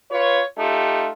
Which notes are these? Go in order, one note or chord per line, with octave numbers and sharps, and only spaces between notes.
F4 B4 C#5
A3 D#4 F4 G4